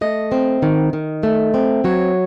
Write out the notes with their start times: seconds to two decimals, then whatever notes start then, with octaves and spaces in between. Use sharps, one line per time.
0.01 A3 D#5
0.32 C4
0.62 D#3
0.93 D#3
1.23 A3
1.54 C4
1.84 F#3 C#5